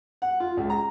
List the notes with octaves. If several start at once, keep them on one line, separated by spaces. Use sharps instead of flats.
F#5
F4
C#2
A#5